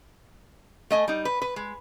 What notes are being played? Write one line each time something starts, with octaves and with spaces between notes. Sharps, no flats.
A3 D#5 G#5
G3 D#4
B4
B4
G#3